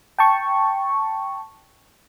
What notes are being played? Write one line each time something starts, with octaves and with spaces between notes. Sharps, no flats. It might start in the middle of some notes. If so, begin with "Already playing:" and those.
G5 A5 C#6